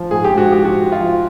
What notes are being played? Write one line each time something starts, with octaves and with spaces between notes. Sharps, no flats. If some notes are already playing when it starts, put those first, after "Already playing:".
Already playing: F3
G#2 G#4
G4
G#2
F#4
F3
G4
F3 F#4
F3
F4
F3